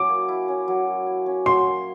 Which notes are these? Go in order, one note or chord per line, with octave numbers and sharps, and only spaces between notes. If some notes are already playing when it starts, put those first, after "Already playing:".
Already playing: F#3 C#4 E4 D6
A#3
E4
C#4
F#3
A#3
E4
C#4
F#3 C6
A#3